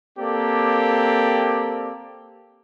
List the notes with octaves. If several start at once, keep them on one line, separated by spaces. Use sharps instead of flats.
A#3 C4 G4 A4 D5